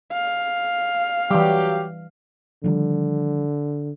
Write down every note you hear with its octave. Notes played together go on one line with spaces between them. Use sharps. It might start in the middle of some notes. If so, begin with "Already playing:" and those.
F5
E3 F#3 G3 G4
D3 D#3 F3 G3